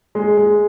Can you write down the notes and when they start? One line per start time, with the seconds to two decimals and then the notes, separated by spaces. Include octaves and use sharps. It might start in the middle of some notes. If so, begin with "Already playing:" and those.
0.15 G#3
0.37 G#3